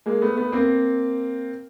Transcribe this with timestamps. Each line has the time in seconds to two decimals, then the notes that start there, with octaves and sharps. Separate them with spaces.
0.06 G#3 A#3
0.21 A3 B3
0.37 A3 B3
0.52 A#3 C4